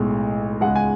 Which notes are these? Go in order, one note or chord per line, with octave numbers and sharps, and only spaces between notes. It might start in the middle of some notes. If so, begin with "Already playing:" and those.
Already playing: B1 A2 G#3
C#2 C#3 G#3 F#5
G#5